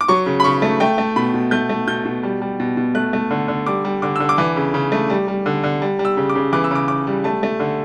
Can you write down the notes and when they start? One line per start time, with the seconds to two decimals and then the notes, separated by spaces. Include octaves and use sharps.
0.01 D6
0.08 F#3 C#6
0.26 C#3
0.40 B5
0.44 C#3 C#6
0.62 A3
0.80 A3 G5
0.98 A3
1.16 B2 B5
1.34 B2
1.51 A3 G6
1.69 A3
1.87 B2 G6
2.05 B2
2.23 G3
2.41 G3
2.60 B2
2.77 B2
2.95 A3 F#6
3.13 A3
3.31 D3
3.48 D3
3.67 G3 D6
3.85 G3
4.02 D3 D6
4.16 D3 E6
4.29 D6
4.38 E3
4.56 C#3
4.74 C#3
4.92 A3
5.09 G3
5.28 G3
5.46 D3
5.64 D3
5.82 G3
5.99 G3
6.05 E6
6.17 C#3
6.30 D6
6.35 C#3
6.53 E3 D6
6.64 E6
6.71 C#3 D6
6.88 C#3 D6
7.07 G3
7.24 A3 A5
7.43 A3
7.60 D3